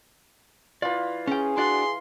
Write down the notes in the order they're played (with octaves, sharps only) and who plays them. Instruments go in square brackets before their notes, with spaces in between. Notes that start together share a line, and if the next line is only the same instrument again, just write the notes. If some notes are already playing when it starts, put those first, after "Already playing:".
[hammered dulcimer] E3 F4 [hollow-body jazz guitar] D5
[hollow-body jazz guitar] C#4 G5 [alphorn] G#4
[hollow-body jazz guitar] D4 F#4 D5 [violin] C6